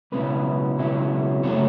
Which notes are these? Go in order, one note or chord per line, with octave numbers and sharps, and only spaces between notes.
C#2 B2 F#3 C#4 E4 B4
C#2 B2 F#3 C#4 E4
F#2 C#3 F#3 A3 C#5